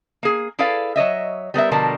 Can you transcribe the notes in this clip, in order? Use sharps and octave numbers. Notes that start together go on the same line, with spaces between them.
A#3 G#4
E4 G#4 A4 B4 D5 F5
F#3 C#5 D#5 E5
G3 B3 A#4 E5
B2 D3 F3 G3 A#4 A5